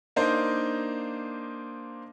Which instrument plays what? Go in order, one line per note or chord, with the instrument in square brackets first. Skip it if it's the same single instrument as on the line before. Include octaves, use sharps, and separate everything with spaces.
[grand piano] A#3 D4 D#4 C5